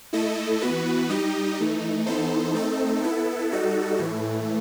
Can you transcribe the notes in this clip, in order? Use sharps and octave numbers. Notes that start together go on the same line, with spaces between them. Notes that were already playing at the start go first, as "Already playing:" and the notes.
A3 E4 A4 D#5
E3 B3 F#4 B4
G3 D#4 G4 D#5
E3 A3 D#4
E3 B3 D#4 A4 C5
A3 C4 D#4 A4
B3 E4 A4
G3 D#4 F#4 A4
A2 E3 A3